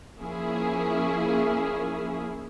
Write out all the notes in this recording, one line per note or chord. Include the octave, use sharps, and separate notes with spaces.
F3 A#3 C#4 E4 G#4